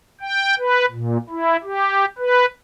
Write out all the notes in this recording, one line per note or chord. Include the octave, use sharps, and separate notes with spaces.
G5
B4
A#2
E4
G4
B4